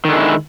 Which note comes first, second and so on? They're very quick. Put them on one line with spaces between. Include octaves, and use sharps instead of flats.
D#3 D3 G#3 E4